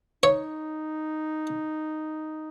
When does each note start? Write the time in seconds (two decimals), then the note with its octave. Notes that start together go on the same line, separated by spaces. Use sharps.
0.23 D#4 C#5